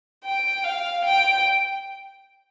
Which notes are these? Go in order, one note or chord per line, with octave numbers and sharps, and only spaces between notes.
G5
F5
G5